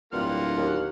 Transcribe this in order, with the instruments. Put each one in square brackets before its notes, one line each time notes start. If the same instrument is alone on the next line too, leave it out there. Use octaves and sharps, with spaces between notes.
[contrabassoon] D1 [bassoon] G2 [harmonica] A#3 F#5 F6 [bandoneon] F4
[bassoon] D#2